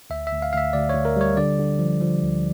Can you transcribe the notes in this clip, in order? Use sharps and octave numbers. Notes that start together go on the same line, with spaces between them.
D2 E5
D2 E5
F5
D2 E5 F5
D2 D5
C#5
D2
A#4
G3 C#5
D3 D5
D3
F3
F3
D2